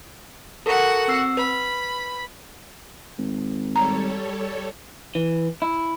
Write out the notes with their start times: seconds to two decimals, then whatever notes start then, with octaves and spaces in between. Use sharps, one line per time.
0.66 F#4 A4 A#4 F#5
1.08 C4 E6 C7
1.37 B4 B5
3.18 G#1
3.76 G3 A4 C#5 A#5
5.15 E3
5.62 E4